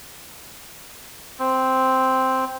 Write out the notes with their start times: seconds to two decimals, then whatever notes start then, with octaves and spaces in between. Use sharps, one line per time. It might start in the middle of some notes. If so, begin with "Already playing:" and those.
1.39 C4